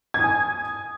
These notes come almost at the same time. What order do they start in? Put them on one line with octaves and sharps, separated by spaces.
G#6 D#6 G#5